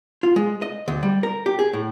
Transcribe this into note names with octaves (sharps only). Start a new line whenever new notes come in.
F4
G#3
D#5
D2
G3
A#4
G4
G#4
A2